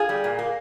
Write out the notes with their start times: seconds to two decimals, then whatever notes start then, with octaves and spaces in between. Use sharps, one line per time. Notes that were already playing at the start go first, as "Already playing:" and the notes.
Already playing: F4 G#4
0.09 G3
0.24 A#2
0.39 A#3